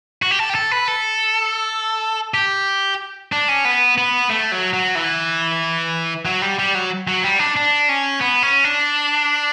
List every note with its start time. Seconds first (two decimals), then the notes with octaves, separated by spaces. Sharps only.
0.22 F#4
0.31 G4
0.39 A4
0.50 G4
0.55 A4
0.71 B4
0.88 A4
2.34 G4
3.32 D4
3.49 C#4
3.65 B3
3.98 B3
4.29 A3
4.52 F#3
4.73 F#3
4.95 E3
6.26 F#3
6.42 G3
6.59 G3
6.75 F#3
7.08 F#3
7.24 G3
7.39 D4
7.56 D4
7.89 C#4
8.21 B3
8.42 C#4
8.64 D4